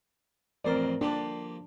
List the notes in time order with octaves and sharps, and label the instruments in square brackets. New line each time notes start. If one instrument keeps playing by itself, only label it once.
[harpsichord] A1 F2 C5 [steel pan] A#4 D5
[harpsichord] F3 A#3 G4 [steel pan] D4